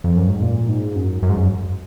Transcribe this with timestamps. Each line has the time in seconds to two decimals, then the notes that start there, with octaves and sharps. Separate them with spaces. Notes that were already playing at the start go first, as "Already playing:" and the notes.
0.04 F2
0.17 F#2
0.29 G#2
0.42 A#2
0.69 G#2
0.96 F#2
1.23 F#2
1.29 G#2
1.37 F#2